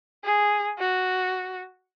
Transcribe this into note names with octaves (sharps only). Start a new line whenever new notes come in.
G#4
F#4